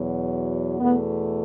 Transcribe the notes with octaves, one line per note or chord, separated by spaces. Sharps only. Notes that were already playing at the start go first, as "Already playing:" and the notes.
Already playing: E2 B2 F#3
E2 B2 A3 B3